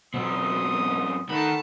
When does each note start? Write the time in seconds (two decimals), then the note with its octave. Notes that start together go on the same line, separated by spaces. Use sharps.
0.14 F#2 B2 C4 C6 D#6
1.29 D#3 A3 F#5 A5 B5